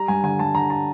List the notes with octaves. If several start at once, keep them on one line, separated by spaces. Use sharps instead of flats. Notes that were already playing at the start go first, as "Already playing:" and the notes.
Already playing: G3 A#5
G2 G#5
D3 G#5
G2 A5
D3 A#5
A5